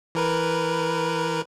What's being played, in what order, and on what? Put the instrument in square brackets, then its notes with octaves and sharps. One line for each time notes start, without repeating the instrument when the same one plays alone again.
[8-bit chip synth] E3 A#4 B4